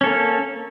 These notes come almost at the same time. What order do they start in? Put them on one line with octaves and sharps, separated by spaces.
C#4 A4 A#3